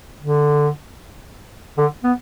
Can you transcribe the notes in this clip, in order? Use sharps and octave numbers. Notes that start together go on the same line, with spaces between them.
D3
D3
B3